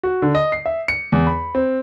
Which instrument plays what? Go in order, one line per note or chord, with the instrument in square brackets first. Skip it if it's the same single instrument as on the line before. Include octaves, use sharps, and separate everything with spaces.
[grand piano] F#4
D3
D#5
C7
E5
C#7
E2
B5
C4